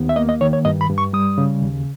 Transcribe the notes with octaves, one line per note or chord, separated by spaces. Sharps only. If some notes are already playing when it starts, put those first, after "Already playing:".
Already playing: D#2 B3
E5
A#3 D#5
D#5
D#3 C#5
C#5
G2 D#5
B5
G2
C#6
G3 D#6
C#3
D#2